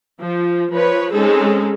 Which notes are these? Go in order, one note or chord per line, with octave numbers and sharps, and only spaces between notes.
F3
F3 B4 C#5
G#3 C4 C#4 D#4 G#4 A4